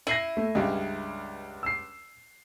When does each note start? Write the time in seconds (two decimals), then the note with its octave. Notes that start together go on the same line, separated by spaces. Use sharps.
0.07 E4 A#6 C7 D#7
0.37 A3
0.55 C#2 G2 C#3 G4 D#5
1.63 E6 C7